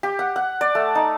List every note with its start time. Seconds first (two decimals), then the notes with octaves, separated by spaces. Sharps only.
0.03 G4
0.19 F#5
0.36 F#5
0.61 D5
0.75 A3
0.95 D#4